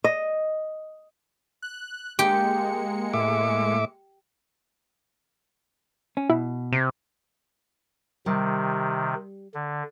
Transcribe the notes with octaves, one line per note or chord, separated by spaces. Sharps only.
D#5
F#6
G#3 A#3 G4 C#7
A2 E5 D6
C#4
B2 E4
C3
C3 D#3 G3
D3